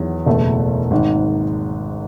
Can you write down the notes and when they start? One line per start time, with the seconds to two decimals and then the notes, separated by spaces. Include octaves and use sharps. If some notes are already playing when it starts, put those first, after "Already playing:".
Already playing: E2 D#3 F#3 B3
0.26 F#1 E2 B2 A3
0.91 G#1 G#2 D#3